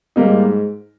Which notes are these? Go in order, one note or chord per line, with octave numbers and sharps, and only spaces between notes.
G#2 G3 A#3 D#4